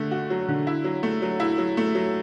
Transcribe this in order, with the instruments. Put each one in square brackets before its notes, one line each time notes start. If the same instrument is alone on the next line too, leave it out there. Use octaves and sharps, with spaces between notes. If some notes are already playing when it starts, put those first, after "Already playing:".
Already playing: [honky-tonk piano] D3 A3
F#4
F#3
D3
E4
F#3
A3
F#3
E4
F#3
A3
F#3